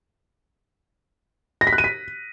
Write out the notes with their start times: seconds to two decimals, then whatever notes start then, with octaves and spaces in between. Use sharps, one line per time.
1.61 A#6
1.67 B6
1.73 F#6
1.78 D#7
1.84 B6